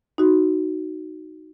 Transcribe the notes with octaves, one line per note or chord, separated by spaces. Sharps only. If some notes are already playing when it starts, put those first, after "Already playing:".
D#4 F#4